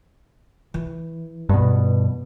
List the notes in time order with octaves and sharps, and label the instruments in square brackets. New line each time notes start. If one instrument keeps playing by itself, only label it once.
[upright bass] E3
[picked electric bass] G2 B2